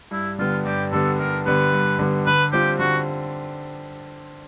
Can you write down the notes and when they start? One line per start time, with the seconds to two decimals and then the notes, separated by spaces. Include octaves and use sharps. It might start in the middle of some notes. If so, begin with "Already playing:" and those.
0.11 G2 E4
0.39 D3 G3 B3 F4
0.65 G2 G4
0.92 D3 G3 B3 A4
1.19 G2 A#4
1.46 D3 G3 B3 B4
1.73 G2
1.99 D3 G3 B3
2.26 D3 B4
2.52 G3 C4 F4 G4
2.79 D3 F#4